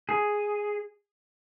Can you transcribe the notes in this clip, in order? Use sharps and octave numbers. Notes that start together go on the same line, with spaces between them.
G#4